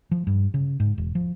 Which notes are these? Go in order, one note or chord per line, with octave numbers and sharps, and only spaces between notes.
F3
G2
C#3
G#2
E1
F3